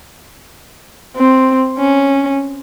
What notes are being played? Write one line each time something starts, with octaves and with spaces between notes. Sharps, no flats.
C4
C#4